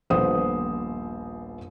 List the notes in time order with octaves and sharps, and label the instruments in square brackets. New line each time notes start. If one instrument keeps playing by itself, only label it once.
[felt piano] D#1 A#1 B3 C5 D#6